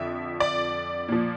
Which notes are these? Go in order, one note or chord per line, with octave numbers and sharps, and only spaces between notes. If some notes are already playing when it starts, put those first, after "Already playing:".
Already playing: F2 D3 F3 E5
D5
A#2 F3